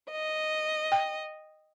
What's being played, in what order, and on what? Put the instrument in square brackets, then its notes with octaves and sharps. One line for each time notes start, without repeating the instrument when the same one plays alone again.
[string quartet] D#5
[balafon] G5